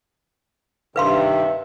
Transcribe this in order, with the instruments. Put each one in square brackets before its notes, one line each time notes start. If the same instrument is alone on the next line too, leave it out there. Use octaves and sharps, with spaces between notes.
[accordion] G2 C3 D#3 [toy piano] B4 F5 C6 [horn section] E5